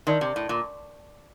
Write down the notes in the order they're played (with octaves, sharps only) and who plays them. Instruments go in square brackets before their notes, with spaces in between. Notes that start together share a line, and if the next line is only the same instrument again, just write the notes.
[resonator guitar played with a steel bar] D#3 [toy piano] A#4 D5 A5 C6
[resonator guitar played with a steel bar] C3
A2
A#2